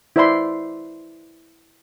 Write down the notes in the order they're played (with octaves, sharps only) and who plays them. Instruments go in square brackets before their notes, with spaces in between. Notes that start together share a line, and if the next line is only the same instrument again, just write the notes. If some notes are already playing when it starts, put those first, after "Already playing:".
[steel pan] E4 C5 D5 E5 B5 C6